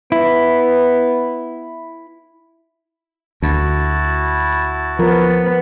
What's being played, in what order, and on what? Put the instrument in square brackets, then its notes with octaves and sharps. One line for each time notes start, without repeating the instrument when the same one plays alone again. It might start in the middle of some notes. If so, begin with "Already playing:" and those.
[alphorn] B3 [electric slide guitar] E4
[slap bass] D2 [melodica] E4 F#4 A5
[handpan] F3 A#4 [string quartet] B3